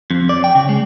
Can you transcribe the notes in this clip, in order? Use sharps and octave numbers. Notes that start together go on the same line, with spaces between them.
F2
D5
G5
C#3
G#3